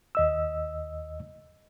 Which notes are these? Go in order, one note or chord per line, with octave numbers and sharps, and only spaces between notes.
D#2 D#5 E6